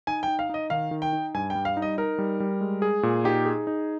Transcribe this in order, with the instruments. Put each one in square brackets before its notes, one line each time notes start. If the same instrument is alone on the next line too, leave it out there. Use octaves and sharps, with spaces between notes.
[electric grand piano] D#4 [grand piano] G#5
[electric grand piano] D#4 [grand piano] G5
[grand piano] F5
[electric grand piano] D#4 [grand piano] D#5
[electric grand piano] D#3 [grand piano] F5
[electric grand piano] D#3
[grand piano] G5
[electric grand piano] D#4
[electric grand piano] G2 [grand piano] G#5
[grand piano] G5
[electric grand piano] G3
[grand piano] F5
[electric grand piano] D#4
[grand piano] D#5
[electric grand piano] D#4 [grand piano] A#4
[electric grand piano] G3
G3
G#3
G#4
A#2
[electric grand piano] D#4 [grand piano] G4
[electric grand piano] G#4
D#4